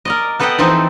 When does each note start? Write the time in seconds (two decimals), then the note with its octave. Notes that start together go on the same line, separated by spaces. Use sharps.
0.05 A#4 D5 D#5
0.40 B3 A4 B4 D#5 F#5 G5
0.58 E3 F3 C4 D#4 A4 C5